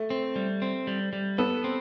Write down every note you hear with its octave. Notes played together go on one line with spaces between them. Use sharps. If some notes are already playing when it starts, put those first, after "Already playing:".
Already playing: A3
C4
G3
C4
G3
G3
B3 A4
C4